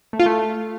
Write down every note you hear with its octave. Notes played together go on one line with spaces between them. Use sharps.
A3
F4
A3